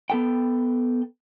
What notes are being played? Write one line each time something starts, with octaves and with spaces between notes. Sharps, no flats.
B3 A4 G5